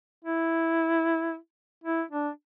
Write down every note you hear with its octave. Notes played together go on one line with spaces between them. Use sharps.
E4
E4
D4